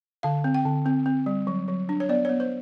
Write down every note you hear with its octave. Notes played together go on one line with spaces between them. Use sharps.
D3 F5
C4
G5
D3
C4
C4
G3
F#3
F#3
D4
C#5
B3 D5
B3 C#5
C5